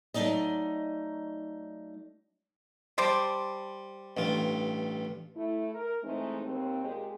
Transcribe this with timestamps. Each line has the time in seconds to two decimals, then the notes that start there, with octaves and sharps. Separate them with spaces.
0.14 F#3 A3 D4 D#4 D5 D#5
2.98 G3 C5 A5 D6
4.17 A1 G2 F4
5.36 A3 E4
5.74 A#4
6.04 E3 G#3 A3 C4 D#4
6.44 D#2 C4
6.84 A#2 G#3 G4 G#4